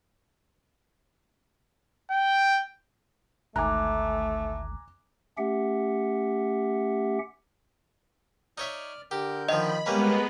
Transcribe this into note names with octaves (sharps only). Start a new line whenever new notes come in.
G5
G#1 D2 G#2 A3 G#5 A#5 D6 F#6
A3 C#4 G4 E5 F#5
D#4 C#5 D5 E5 F6
D3 G4 A#4 G6
D#3 F3 D#5 B5
G3 G#3 A#3 B3 C#4 B4 A#5 B5